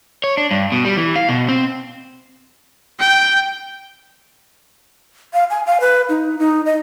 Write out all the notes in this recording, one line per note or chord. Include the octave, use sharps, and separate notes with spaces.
C#5
D4
G2
B2
G3
E3
F5
B2
C4
G5
F5
G#5
F5
B4
D#4
D#4
D#5